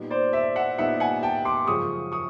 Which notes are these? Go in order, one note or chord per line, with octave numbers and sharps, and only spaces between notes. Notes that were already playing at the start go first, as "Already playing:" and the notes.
Already playing: A#2 G3 B3 D#4
C5 D5
D5 E5
E5 F#5
A#2 G3 B3 D#4 E5 F#5
F#5 G#5
G5 A5
C6 D6
F#2 C#3 F3 G#3 C#6 D#6
C#6 D#6